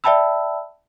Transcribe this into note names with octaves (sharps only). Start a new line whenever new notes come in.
D5 E5 G5 A5 B5 E6